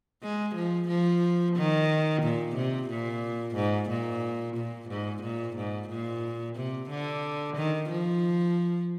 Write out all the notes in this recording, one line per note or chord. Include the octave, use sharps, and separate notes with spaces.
G#3
F3
F3
D#3
A#2
C3
A#2
G#2
A#2
A#2
G#2
A#2
G#2
A#2
C3
D3
D#3
F3